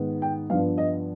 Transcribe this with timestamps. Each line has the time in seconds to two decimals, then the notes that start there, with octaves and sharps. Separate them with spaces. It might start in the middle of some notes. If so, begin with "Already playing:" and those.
Already playing: G#2 D#3 B3
0.22 G5
0.50 G2 F3 B3 F5
0.78 D#5